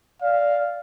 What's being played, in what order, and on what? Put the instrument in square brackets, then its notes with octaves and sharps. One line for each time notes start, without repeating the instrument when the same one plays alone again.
[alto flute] D5 [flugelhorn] F5